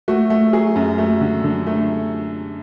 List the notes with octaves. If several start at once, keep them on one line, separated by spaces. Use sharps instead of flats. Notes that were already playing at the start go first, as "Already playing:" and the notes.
A3 F#4
A3
F#3 G#4
F#2
A3
D3
D3
A3